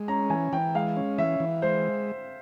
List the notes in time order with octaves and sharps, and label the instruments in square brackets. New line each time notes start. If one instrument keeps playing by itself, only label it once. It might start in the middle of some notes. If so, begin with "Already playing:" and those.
Already playing: [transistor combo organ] G#3
[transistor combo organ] C#4 [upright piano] A#5
[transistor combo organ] E3 [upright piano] G#5
[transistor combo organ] E3 [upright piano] G5
[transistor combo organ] G#3 [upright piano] F5
[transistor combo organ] C#4
[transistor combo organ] E3 [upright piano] E5
[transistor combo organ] E3
[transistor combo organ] G#3 [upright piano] C5